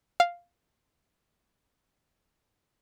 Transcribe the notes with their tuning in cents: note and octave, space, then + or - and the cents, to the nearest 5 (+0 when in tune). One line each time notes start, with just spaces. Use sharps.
F5 +0